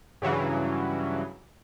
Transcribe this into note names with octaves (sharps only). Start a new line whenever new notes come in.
G2 C#3 E3 F#3